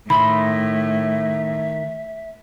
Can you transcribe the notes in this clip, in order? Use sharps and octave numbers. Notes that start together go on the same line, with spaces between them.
A2 D#3 D#5 E5 B5 C6